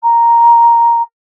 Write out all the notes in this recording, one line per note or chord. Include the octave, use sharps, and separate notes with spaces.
A#5